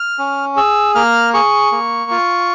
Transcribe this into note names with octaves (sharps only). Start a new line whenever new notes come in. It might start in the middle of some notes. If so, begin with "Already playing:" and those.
Already playing: F6
C#4
G#4 E6
A#3 F6
G#4 C#6
A#3
F4